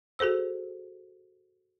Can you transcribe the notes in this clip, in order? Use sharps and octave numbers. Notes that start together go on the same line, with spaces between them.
F#4 G#4 A4 C5 E6